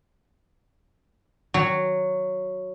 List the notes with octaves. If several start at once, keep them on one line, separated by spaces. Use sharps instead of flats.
F#3